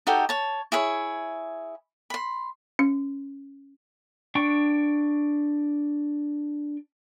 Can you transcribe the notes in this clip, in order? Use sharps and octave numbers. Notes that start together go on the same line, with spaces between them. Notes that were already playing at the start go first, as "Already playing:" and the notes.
D#4 F#4 G4 A4
C#5 A5
E4 G#4 C#5
B5 C6
C#4
D4 G5 C#6